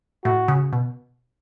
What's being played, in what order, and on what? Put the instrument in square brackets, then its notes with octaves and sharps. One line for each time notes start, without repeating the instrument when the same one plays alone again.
[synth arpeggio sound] A2 [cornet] F#4
[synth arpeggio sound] C#3
B2